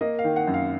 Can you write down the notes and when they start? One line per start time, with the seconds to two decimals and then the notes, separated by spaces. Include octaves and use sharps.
0.01 A#3 D#5
0.19 F5
0.24 D#3
0.36 F#5
0.47 F#2
0.54 F5